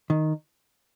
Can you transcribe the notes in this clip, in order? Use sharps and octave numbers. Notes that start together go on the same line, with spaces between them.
D#3